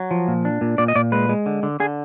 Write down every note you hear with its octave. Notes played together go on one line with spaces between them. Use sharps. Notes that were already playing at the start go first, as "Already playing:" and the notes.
Already playing: F#3
F3
A#2
D4
A#2
A#2 D5
D#5
A#2 D5
G#3 B4
G#3
D3
D3
D3 G#4